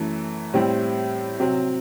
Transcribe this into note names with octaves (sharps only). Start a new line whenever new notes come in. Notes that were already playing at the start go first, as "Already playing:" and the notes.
Already playing: F#2 E3 A3
A2 G3 C4 E4
C3 F#3 C4